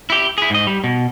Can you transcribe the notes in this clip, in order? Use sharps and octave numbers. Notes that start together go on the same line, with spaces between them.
E4 G4
E4 G#4
G#2 D#5
G3
B2